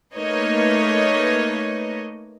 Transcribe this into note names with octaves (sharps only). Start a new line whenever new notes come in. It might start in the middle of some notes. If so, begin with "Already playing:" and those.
A3 A#3 D#4 B4 C#5 D#5